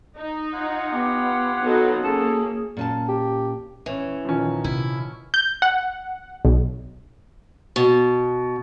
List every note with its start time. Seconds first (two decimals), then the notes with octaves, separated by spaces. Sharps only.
0.18 D#4
0.53 F4 C#5 F#5
0.93 B3 G4
1.62 F#3 B3 D#4 A4
2.04 A#3 C#4 G#4 A4
2.77 A#2 C#4 A5
3.08 G4
3.86 E3 C#4
4.25 A#2 D#3 F3 C#4
4.64 C3 E4
5.34 G6
5.62 F#5
6.45 B1
7.76 B2